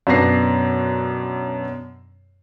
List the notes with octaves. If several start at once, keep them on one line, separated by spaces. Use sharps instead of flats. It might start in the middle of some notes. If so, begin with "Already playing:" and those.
F#2 B2 B3 D4 A#6 C7